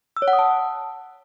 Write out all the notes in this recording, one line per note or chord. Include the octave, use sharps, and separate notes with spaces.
E6
C#5
F#5
D#6
A5